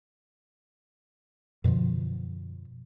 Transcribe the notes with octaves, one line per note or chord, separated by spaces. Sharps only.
F#2 B2 D3 F3